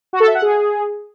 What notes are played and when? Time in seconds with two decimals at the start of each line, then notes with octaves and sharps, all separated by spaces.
0.13 F#4
0.20 A4
0.28 E5
0.35 F#5
0.42 G#4